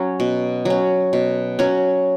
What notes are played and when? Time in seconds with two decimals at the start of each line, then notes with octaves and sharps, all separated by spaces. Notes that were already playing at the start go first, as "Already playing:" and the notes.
Already playing: F#3 C#4
0.20 B2
0.65 F#3 C#4
1.13 B2
1.59 F#3 C#4